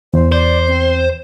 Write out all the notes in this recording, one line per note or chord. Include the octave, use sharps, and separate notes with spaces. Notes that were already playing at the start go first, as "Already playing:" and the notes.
E2 C5
C5 D5
C4